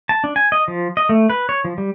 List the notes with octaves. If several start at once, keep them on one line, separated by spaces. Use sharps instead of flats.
A5
D4
G#5
D#5
F3
D#5
A3
B4
C#5
F3
G3